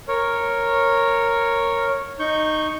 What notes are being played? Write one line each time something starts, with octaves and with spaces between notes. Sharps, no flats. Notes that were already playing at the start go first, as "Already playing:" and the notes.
A#4 C#5
D#4 C#6 G6